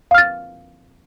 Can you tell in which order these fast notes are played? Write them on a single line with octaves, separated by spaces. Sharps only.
F5 F6 A6